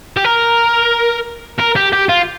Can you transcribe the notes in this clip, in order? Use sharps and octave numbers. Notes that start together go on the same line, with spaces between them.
G4
A#4
A#4
G4
G4
F4